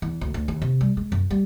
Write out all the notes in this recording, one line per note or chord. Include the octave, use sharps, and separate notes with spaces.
E2
D2
D2
D#2
C3
G3
G#3
F#2
G3